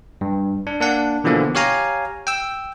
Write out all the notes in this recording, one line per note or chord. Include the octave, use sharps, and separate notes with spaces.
G2
D4
A#3 D4 F#5
B2 D3 E3 F3 A#3 B3
G4 C#5 F5 G#5 A#5
G5 E6